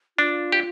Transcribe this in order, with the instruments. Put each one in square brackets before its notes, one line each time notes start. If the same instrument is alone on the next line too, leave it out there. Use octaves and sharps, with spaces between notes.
[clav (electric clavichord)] D4 [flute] F4
[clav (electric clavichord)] G4